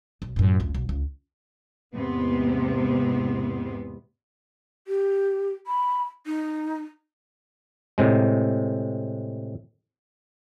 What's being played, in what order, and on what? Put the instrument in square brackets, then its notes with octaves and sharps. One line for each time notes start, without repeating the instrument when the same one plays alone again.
[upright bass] B1
F#2 A2
F1 C#2
B1
C#2
[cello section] E2 G#2 C3 G#3 A#3 B3
[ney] G4
B5
D#4
[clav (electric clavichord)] A2 C3 G#3